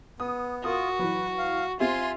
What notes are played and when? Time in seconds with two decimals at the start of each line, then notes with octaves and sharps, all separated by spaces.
0.20 B3 D#6
0.64 F4 F#4 A#4 D#6
0.99 E3 F#3 B4
1.38 F5
1.80 C4 F4 G4 E5 G#5 C6